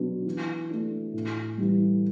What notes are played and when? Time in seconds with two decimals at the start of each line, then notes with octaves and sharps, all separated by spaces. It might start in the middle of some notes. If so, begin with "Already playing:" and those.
Already playing: B2 F#3 B3 D4 F#4
0.26 E3
0.69 A3 D4
1.13 A2
1.58 E3 G3